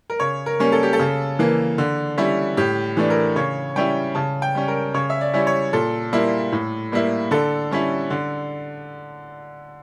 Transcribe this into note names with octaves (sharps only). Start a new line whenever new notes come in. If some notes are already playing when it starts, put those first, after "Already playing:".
A#4
C#3 C#5
A#4
G3 A#3 C#4
A4
G4
A4
C#3
E3 A#3
D3
G3 C#4 E4
A2 G4
E3 A3 D4
A#4
C#3 C#5
G3 C#4 E4 G5
C#3 A5
G5
G3 C#4
A#4
C#3 C#5
E5
D5
G3 C#4 E4
C#5
A#2 A4
G3 A#3 E4
A2
G3 A#3 E4
D3 A4
G3 C#4 E4
D3